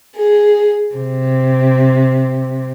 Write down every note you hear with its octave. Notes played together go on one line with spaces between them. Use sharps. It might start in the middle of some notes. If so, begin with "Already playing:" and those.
G#4
C3